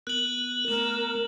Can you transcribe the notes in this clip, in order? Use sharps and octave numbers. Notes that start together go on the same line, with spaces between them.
B3 A#4 F#6 F#7
A3 B3 A#4